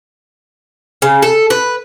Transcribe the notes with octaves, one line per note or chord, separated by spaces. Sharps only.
C#3
A4
B4